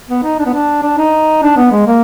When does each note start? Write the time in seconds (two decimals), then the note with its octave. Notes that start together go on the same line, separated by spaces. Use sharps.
0.09 B3
0.23 D#4
0.39 D4
0.46 B3
0.54 D4
0.83 D4
0.98 D#4
1.43 D4
1.57 B3
1.72 G#3
1.87 A#3